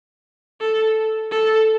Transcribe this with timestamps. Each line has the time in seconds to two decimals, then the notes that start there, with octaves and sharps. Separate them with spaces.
0.61 A4
1.31 A4